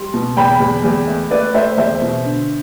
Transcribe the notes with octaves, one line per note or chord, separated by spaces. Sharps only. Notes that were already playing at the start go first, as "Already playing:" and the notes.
Already playing: G3 C6
B2
E2 G5 B5
E2
E2
A3
A3 B4 D5
A3 C5 E5
E2 C5 E5
B2
D3